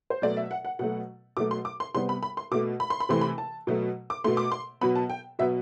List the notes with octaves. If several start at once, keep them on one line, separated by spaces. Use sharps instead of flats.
C5
B2 F#3 A3 D5
E5
F#5
F#5
B2 F#3 A3 F#5
B2 F#3 A3 D6
C6
D6
C6
C3 G3 B3 C6
B5
B5
C6
B2 A3 D6
B5
C6
B5
C3 E3 A3 C6
B5
A5
B2 F#3 A3
D6
B2 A3 C6
D6
C6
B2 F#3 B3 B5
A5
G5
B2 F#3 B3 E5